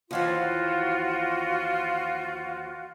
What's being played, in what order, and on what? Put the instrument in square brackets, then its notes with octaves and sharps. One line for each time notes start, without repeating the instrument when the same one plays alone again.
[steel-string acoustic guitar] D#2 E3 F3 [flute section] F4 F#4